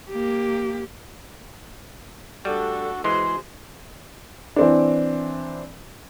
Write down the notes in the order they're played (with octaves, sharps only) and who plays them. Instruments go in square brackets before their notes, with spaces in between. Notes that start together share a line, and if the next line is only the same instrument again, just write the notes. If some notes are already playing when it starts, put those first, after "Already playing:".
[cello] A#3 G4
[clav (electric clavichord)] G3 [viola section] A3 D4 A4 [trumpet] F#4
[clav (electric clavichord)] E3 G#3 [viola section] F#4 G#4 C5 [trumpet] C6
[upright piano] E3 C4 D4